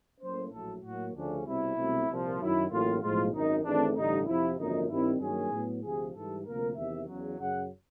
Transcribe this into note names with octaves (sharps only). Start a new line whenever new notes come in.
A2 F#3 A#3 C#4 C5
A#1 A2 F#3 A4
A2 F#3 A#3 F#4
D2 C#3 F3 A3 C#4 D4
C2 B2 G3 C4 E4
C2 B2 F#3 A3 C4
C2 A#2 F3
F#2 D#3 F#3 E4
A1 A2 F#3 A#3 F4
B1 A2 F3 G#3 F4
G#1 F#2 D#3 D#4
G#1 G#2 E3 A3 C4 D4
A1 G2 D3 G3 D#4
F2 C3 F3 E4
G#1 F#2 D3 F3 A#3 D#4
G2 D#3 G3 C4 E4
G2 D#3 F#3 A#3 C#4 G#4
A2 F#3 B3
D2 C3 F3 G#4
G#2 E3 G3 A4
D2 C3 F3 A#3 A#4
E2 C3 D#3 E5
E2 C#3 F#3
F#2 C#3 F#3 F#5